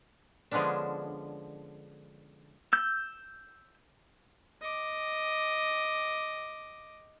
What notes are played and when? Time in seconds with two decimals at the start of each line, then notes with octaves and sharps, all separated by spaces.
0.51 D3 F3 G#3 B3 C#4 D4
2.73 E6 G6
4.62 D#5 D6